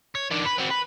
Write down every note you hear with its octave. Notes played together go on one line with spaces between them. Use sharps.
C#5
D#3 D4
B4
C4 F#4
B4